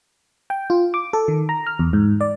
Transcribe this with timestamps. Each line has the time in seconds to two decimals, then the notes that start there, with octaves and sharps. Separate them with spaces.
0.50 G5
0.70 F4
0.94 D6
1.13 A4
1.28 D#3
1.49 A#5
1.67 F6
1.79 E2
1.93 G#2
2.21 D5